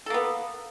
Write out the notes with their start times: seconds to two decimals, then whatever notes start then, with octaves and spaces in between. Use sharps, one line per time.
0.06 A4
0.10 A#3
0.14 B3